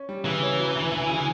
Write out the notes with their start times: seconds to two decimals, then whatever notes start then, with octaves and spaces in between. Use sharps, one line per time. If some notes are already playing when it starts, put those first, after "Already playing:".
Already playing: C#4
0.09 G3
0.25 C#3 E3
0.42 C#4
0.59 F#3
0.76 D2
0.92 D2
1.09 C#3